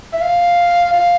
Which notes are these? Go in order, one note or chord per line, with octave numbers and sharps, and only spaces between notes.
E5
F5
F5